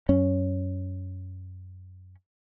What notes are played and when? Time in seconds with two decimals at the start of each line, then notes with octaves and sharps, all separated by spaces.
0.09 F#2 C#4